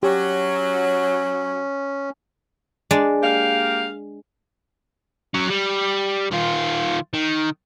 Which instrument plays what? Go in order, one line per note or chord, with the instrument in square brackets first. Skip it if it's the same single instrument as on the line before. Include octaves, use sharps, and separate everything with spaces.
[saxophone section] F#3 [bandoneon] C#4 [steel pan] G4
[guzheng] G#3 D4 D5
[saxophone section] A#3 G4 F5
[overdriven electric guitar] F#3 C#4
G3
D#3 F4
D#3